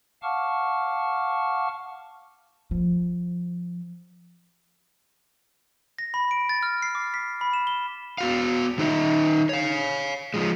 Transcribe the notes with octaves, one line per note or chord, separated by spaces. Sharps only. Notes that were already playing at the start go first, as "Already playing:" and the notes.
F5 F#5 A5 C#6 D6 F6
F3
A#6
B5
D7
A6
F6
C7
D6
B6
B5
E7
G7
B3 F#4 F5
D#3 D#4 G#4 B4 D#5 E5
C#5 F5
F3 G#3